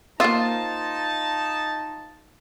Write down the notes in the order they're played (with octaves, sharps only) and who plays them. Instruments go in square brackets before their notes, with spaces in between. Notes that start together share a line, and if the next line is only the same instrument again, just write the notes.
[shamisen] A#3 E5 [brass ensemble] D#4 A5 [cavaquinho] F4 C5 D#6